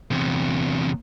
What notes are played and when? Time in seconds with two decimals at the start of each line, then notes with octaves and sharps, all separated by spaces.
0.11 E2 C3